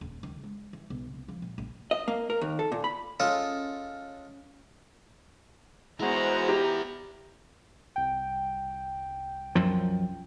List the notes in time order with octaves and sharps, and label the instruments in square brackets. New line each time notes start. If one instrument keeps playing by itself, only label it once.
[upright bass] D#1
D#3
G#3
E3
B1
C2
F3
A#2
A#1
[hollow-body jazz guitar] D#5
A#3
A#4
D#2
A4
A#2
B5
[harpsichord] G#3 F4 A4 [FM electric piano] C#4
[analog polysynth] G#3 F#4 C5 [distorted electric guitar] B3 E4 [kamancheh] A#5
[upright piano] G4
[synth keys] C2 G5
[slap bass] F#2 F3